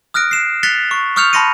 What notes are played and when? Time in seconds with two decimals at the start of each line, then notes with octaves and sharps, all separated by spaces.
0.14 D#6 F6 F#6 A#6 D7
0.31 C7 E7
0.63 F#6 A6 B6 C#7 F7 G7
0.91 C#6
1.16 C#6 D#6 F6 G6 C#7 F7
1.33 A5 B5 C6 A#6 C#7 D#7